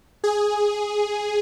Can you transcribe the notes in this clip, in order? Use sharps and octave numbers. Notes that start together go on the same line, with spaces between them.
G#4